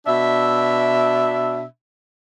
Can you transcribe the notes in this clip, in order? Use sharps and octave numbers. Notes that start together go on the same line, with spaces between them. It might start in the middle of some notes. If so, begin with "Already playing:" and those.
B2 D4 E5